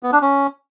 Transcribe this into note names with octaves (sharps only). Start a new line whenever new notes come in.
B3
D4
C#4